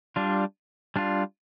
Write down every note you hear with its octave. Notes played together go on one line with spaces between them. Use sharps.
G3 D4 F4
G3 D4 F4